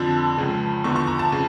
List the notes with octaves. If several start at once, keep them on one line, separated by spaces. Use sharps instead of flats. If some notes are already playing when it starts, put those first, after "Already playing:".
Already playing: F2 D3 F3 A5
C#2 C#3 F3
E2 D3 F3 C#6
C#6
A#5
A5
C#3 F3